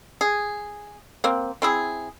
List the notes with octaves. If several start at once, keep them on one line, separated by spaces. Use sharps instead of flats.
G#4
A#3 C4
C4 E4 G#4